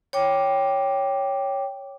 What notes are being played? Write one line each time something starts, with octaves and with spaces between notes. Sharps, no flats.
C#5 G5 D6